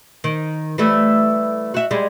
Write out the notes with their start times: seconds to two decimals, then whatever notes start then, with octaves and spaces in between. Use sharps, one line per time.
0.24 D#3
0.78 E3 G3 A3
1.74 F#4 E5
1.91 G3 G#3